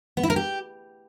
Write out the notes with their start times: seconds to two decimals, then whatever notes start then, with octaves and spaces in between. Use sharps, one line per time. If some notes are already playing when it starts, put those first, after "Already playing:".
0.17 B3
0.23 E4
0.30 A#4
0.36 G4